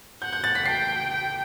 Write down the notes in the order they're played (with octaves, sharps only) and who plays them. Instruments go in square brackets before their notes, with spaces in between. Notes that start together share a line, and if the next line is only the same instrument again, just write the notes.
[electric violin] F#5 [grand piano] G6
[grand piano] G6
A6
B6
[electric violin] G5 [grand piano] C7
[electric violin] G5